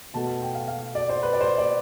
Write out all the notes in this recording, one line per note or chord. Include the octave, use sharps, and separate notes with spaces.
B2 A3 A5
A5
G5
F5
F5
D5
C5
B4
D5
C5
D5